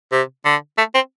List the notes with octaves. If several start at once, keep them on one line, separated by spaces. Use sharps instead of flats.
C3
D3
A3
C4